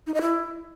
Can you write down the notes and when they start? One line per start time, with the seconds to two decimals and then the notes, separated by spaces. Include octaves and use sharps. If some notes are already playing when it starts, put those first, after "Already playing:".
0.07 D#4
0.14 D#5
0.21 E4